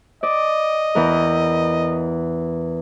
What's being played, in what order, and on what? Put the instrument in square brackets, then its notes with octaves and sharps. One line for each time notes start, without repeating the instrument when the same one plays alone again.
[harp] D5 [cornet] D#5
[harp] E2 E3 A#4